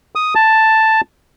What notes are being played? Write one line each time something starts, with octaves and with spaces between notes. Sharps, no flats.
D#6
A5